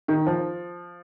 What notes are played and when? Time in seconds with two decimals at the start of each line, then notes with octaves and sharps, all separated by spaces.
0.08 D#3
0.26 F3